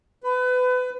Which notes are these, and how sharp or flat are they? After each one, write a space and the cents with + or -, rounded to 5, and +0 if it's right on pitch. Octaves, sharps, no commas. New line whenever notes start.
B4 +30